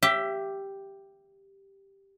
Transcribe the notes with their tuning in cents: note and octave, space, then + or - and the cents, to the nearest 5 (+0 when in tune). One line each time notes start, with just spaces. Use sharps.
G4 +0 E5 +25